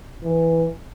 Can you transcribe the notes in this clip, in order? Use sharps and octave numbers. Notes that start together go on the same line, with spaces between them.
E3